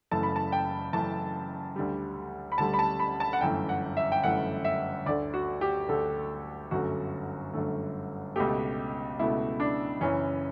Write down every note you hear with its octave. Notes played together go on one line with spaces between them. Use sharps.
F#1 F#2 E3 A3 A5
B5
A5
G5
F#1 F#2 E3 A3 A5
D2 D3 G3
B5
D2 D3 G3 A5
B5
A5
B5
A5
F#5
G1 F#2 E3 A3 G5
F#5
E5
G5
G1 F#2 E3 A3 F#5
E5
D2 D3 A3 D5
F#4
G4
D2 D3 A3 A4
G1 F#2 D3 A3 F#4
G1 F#2 D3 A3
C#2 B2 A3 G4
C#2 B2 A3 E4
D4
F#1 F#2 E3 C#4